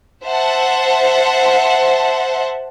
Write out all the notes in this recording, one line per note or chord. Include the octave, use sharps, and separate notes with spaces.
C5 E5 F#5 A5